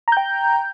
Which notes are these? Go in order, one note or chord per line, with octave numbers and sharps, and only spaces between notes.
G5 A#5 G6